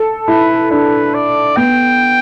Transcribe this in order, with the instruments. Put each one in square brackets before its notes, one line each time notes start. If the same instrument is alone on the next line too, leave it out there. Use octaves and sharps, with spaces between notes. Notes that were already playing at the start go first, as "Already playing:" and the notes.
Already playing: [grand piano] A4
[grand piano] E4 [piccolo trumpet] B4
[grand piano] D4 [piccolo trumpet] B4
[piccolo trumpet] D5
[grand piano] B3 [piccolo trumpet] G5